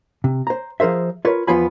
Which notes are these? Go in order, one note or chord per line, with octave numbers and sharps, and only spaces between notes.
C3
C5 A#5
F3 G#4 A#4 C5 E5
F4 A#4 B4 C#5
E2 F3 B3 F4 G#5 B5